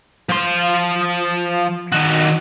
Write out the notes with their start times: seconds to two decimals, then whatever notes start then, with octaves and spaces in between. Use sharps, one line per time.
0.29 F3 C6
1.92 D#3 F#4